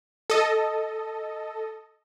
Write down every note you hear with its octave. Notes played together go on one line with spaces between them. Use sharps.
A4 D#5